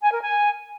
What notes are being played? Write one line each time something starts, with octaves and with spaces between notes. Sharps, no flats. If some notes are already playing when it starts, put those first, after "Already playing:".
G#5
A#4
G#5